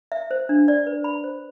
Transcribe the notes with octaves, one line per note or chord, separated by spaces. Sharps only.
E5
C5
D4
D5
B4
B5
C5